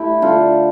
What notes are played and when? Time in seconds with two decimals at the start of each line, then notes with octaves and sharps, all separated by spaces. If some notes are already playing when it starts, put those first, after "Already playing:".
Already playing: A3 E4 G4
0.22 D3 F4 A4